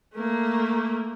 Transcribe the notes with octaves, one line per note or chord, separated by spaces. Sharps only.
A3 A#3